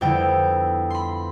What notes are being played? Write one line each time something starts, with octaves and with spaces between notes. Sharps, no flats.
F2 D3 G3 B3 E4 G5
B5 C6